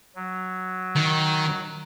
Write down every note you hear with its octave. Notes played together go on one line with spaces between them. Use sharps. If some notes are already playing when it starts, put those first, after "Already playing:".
F#3
D#3